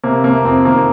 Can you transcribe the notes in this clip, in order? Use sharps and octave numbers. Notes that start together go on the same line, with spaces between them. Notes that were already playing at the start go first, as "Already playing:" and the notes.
C3 A#3
A3 A#3
F2 C4
D#3 A#3